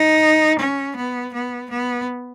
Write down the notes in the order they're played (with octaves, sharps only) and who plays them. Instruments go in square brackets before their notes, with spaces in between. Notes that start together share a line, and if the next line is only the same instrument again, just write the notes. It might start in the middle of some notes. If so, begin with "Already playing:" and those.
Already playing: [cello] D#4
C#4
B3
B3
B3